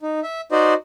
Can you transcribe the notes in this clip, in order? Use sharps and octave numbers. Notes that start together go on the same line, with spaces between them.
D#4
E5
D#4 F#4 C5 D5 D#5